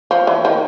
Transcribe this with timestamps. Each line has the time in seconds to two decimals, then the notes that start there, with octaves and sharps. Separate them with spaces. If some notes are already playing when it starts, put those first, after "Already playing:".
0.11 F3
0.27 E3
0.45 D#3